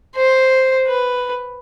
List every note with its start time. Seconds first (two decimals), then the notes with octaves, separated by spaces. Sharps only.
0.16 C5
0.88 B4